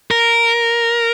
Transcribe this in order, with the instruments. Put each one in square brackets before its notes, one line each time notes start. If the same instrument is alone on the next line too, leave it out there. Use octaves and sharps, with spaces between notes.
[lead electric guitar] A#4